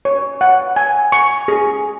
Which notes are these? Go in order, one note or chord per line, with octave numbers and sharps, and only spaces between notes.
C#5
F#5
G#5
C#6
G#4